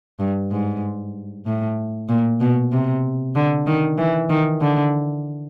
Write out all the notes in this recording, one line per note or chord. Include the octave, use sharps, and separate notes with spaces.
G2
G#2
A2
A#2
B2
C3
D3
D#3
E3
D#3
D3